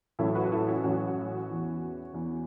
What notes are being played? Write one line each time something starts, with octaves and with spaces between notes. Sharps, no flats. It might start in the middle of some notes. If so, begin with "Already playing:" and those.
A1 A2 F#3 E4 A4
F#4 B4
E4 A4
C#4 F#4
A1 A2 F#3 C#4 F#4
E2 E3
E2 E3